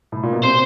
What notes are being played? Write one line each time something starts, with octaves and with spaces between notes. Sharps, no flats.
A2
A#2
B2
C3 C5